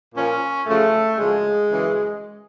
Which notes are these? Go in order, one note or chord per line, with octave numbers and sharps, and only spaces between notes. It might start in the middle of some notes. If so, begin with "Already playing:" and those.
A#2 F3 C#4
F#2 C#3 F3 A3
F#2 C#3 F3 G#3
F#2 C#3 E3